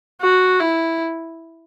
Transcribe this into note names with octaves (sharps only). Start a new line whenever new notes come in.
F#4
E4